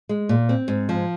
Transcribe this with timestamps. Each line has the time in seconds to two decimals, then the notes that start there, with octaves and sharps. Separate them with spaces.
0.09 G#3
0.29 A#2
0.49 C4
0.68 G#2
0.89 F3